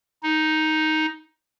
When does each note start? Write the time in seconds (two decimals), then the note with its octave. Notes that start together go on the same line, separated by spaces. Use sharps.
0.23 D#4